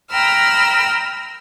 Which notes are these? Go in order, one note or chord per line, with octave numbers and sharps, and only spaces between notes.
G5 A#5 B5 E6 F6